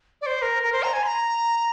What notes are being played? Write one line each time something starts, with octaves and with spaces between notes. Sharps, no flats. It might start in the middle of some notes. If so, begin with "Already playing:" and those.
D5
C5
A#4
A#4
C5
A#5
G#5
C6
A#5